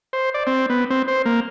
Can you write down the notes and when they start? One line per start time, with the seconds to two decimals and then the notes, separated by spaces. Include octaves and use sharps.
0.13 C5
0.34 D5
0.47 C4
0.70 B3
0.90 C4
1.08 C5
1.26 A#3